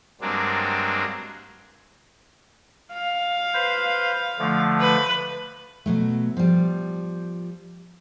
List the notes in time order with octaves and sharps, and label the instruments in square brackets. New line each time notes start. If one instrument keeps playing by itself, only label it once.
[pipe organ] G2 F#3 G#3 A#3 C4 D4
[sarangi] F5
[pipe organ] B4 C5
D3 F3 A3
[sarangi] B4
[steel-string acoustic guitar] B2 F#3 A3
F3 G3